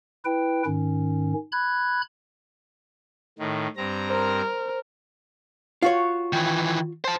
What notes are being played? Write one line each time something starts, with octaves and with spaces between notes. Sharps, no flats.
E4 B4 G5
G#2 D#3 C#4
B5 F#6 G#6
A2 D#3
G2 C4 A#5
A#4 C5
F4 F#4 C#5
D#3 E3
C5 A5